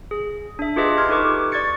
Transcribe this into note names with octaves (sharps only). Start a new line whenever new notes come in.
G#4
D4 E5
F4 G4 G#4 B4 D#5 E5
C6 F6 G#6
D#4 G4 A4 B4 C#6 D6
D5 C#6 G#6 A6 C#7